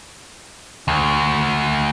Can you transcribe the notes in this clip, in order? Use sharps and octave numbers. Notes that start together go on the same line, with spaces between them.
D2